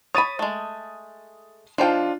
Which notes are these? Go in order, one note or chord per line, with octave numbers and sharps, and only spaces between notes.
C#5 B5 D#6 A6 D#7
G#3 A3
F3 D4 D#4 F4 G5